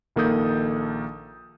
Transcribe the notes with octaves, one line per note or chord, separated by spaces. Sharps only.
A#1 D#3 A#3 A4 D#6 G6